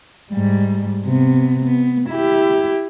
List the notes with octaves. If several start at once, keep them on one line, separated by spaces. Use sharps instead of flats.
G#2 G3
C3 B3
B3
E4 G4